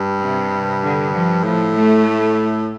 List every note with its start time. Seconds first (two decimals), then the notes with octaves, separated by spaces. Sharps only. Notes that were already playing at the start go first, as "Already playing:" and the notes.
Already playing: G2
0.20 C3
0.83 D3
1.13 F3
1.44 A2 F3
1.76 A3